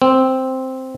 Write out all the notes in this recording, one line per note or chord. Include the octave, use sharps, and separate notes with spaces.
C4